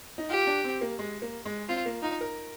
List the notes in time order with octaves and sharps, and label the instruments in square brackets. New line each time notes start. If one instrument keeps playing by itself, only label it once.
[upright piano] D#4
[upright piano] F4 [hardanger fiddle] G4
[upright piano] D4
C4
A#3
G#3
A#3
G#3
[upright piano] C4 [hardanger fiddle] F4
[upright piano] A#3
[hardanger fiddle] D#4 [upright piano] F4
[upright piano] A#4